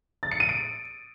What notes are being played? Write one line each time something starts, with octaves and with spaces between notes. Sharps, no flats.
A6
C#7
D#7
D7